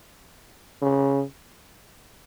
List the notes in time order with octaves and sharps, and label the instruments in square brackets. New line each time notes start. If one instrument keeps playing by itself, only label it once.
[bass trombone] C#3